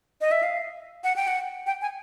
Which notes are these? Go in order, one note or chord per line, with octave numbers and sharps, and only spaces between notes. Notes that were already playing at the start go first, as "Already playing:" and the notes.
D#5
E5
F5
F#5
G5
F#5
G5
G#5